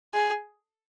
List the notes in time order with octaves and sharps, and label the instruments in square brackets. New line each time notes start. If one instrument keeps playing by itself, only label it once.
[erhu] G#4